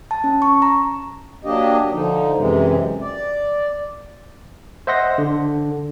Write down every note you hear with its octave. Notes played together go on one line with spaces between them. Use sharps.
A5
C#4
C#6
A#5
F#3 A#3 D4 G4 D#5
D3 F3 D#4
F#2 C3 E3 G#3
D5
C5 D#5 E5 F#5 C6 A#6
D3